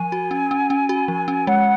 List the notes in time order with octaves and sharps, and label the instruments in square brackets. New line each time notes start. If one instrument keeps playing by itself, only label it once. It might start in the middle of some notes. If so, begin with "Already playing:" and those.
Already playing: [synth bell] F3 [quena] G#5
[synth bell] F#4
C#4
C#4
C#4
F#4
F3
C#4
[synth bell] G#3 [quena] F#5